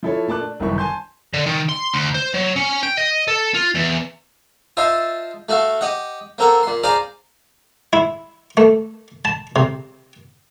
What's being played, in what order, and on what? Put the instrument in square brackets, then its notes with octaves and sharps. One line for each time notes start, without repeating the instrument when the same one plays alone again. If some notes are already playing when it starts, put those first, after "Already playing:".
[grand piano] F3 E4 A4 C#5
A#2 A3 A5 D6 F#6
D4
G1 C2 F#2 D#3 E4 C#6
G#5 A5 C6 G6
[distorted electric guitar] D3
D#3
C6
D2
C5
F#3
C#4
G5
D#5
A4
F4
E2
[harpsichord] F4 C5 D#5 E5 A5 C6
A3 F#4 A4 F5
G4 D#5 F#5
A#3 C4 A4 A#4 F#5
A#2 C6
G#4 C5 D5 F5 A#5 D6
E4
A3
A5
C3